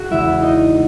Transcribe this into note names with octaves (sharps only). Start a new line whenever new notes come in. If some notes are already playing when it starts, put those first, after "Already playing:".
Already playing: F#4 G#4 F#5
E2 C#3 G#3 E4 E5
D#4 D#5